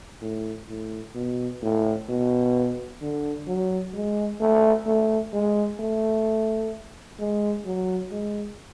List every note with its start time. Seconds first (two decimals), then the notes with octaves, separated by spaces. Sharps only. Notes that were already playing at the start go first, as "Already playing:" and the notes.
0.22 A2
0.68 A2
1.15 B2
1.62 A2
2.09 B2
3.01 D3
3.47 F#3
3.94 G#3
4.40 A3
4.86 A3
5.33 G#3
5.80 A3
7.20 G#3
7.65 F#3
8.11 G#3